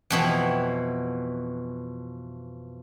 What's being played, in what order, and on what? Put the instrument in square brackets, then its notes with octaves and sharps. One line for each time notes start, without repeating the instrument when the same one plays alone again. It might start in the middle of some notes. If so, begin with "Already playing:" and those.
[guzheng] F2 B2 E3